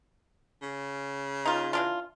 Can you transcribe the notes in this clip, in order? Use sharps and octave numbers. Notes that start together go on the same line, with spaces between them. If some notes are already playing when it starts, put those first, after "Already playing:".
C#3
D#4 F4
E3 D4 F4